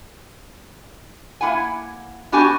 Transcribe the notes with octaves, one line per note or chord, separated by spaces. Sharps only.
A#3 E4 F#5 G#5
B3 D4 F#4 G4 G#5